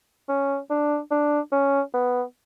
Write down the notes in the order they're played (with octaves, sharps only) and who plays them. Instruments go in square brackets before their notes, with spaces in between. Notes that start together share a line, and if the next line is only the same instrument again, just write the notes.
[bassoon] C#4
D4
D4
C#4
B3